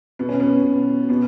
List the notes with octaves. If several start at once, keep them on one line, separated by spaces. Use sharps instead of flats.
B2 B3
C#4
B3
B2
B2 B3